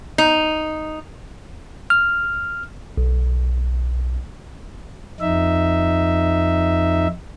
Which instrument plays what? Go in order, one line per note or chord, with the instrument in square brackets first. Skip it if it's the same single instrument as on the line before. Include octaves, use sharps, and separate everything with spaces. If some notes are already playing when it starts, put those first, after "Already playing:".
[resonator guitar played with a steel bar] D#4
[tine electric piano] F6
B1
[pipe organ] F2 D#4 E5